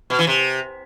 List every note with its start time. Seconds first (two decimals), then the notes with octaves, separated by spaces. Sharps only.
0.10 B2
0.19 E3
0.27 C3